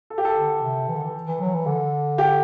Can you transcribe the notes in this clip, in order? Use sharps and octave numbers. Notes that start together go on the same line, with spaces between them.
A4
G4
A4
D3
C3
E3
D3
E3
E3
F#3
E3
D3
G4